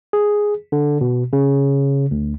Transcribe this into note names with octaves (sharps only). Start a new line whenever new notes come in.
G#4
D3
B2
C#3
D2